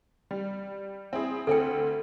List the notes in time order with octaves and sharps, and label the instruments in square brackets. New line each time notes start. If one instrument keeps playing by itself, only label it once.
[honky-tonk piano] G3
C4 E4 G#4
[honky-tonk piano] D2 C4 [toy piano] A4 G5